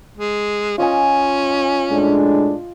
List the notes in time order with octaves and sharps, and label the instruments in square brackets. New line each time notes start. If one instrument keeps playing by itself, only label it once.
[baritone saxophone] G#3
[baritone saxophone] C#4 [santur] F4 D#5 G#5
[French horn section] A2 G#3 D4